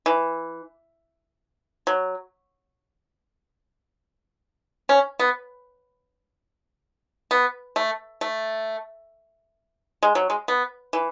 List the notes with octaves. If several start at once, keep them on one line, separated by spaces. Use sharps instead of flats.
E3
F#3
C#4
B3
B3
A3
A3
G#3
F#3
G#3
B3
E3